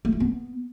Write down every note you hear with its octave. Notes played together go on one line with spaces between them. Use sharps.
A3
F4
B3